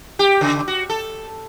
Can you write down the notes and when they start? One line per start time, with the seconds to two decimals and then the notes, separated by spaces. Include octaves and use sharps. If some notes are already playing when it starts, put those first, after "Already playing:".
0.19 G4
0.41 C#3
0.68 F#4
0.90 A4